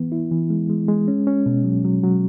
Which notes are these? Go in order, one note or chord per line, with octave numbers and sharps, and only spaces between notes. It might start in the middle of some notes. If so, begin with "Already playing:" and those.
Already playing: E3 B3
E4
E3
G#3
G#3
G#3
C#4
C#4
B2
F#3
F#3
F#3